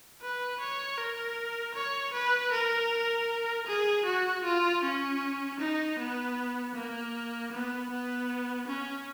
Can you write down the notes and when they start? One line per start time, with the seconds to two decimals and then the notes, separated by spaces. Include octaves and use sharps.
0.22 B4
0.60 C#5
0.98 A#4
1.75 C#5
2.13 B4
2.52 A#4
3.67 G#4
4.05 F#4
4.44 F4
4.83 C#4
5.59 D#4
5.99 B3
6.75 A#3
7.52 B3
7.90 B3
8.67 C#4